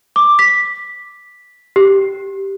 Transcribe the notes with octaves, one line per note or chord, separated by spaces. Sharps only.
D6
B6
G4